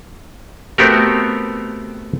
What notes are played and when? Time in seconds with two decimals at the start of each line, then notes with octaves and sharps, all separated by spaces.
0.78 A3 B3 C4 F#4 G4 A#4